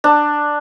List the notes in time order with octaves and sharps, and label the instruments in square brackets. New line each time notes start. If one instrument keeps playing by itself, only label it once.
[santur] D4